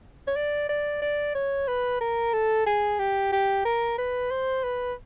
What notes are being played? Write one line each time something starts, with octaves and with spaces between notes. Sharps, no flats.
C#5
D5
D5
D5
C#5
B4
A#4
A4
G#4
G4
G4
A#4
B4
C5
B4